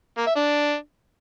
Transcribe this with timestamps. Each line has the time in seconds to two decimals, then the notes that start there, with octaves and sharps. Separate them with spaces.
0.18 A#3
0.27 E5
0.36 D4